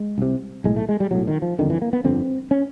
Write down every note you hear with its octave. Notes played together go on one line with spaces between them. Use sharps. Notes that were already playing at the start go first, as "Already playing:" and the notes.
Already playing: G#3
C2 C3
B1 A2 G#3
A3
G#3
G3
B1 A2 F#3
D#3
F3
G1 F2 D3 D#3
E3
A#3
B3
G1 F2 D3 C4
C#4